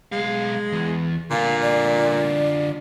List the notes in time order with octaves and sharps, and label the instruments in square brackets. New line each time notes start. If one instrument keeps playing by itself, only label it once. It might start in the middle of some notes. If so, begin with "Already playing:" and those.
[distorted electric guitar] B1 F5 [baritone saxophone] G#3
[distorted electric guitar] E2
[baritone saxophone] A#2 [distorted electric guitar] D3 F4 [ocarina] F5
[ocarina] D5